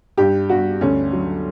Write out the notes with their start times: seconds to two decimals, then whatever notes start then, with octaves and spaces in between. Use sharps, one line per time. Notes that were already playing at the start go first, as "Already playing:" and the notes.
0.18 G2 G4
0.49 G2 F#4
0.81 D2 C#4
1.13 F#3